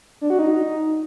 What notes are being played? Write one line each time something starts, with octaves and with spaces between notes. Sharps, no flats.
D4
F#4
D#4